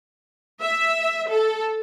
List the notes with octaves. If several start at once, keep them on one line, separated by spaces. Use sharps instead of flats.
E5
A4